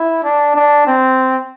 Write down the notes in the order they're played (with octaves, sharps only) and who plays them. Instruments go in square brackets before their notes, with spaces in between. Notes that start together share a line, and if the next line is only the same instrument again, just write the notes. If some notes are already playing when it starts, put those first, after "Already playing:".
Already playing: [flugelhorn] E4
D4
D4
C4